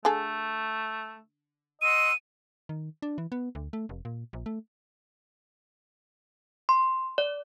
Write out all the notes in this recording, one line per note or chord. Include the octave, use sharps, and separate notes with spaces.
D3 A3 G#4 A4
D#5 F#5 C6 E6 D#7
D#3
D4
E3
B3
D2
A3
F1
A#2
A#1
A3
C6
D5